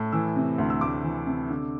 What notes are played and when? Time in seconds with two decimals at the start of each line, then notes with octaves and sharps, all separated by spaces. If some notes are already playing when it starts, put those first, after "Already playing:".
Already playing: A2
0.12 E3 E6
0.36 C3
0.58 D2
0.70 E6
0.81 D2 D6
1.04 E3
1.27 C3
1.50 D3